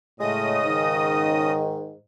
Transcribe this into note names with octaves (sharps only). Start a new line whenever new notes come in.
A2 C#3 G#3 D#5 D#6
G#2 D#3